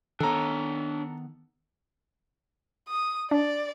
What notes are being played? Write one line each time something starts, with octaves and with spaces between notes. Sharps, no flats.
D#3 B3 D4 A4 C#5 A#5
D#6
D4 D5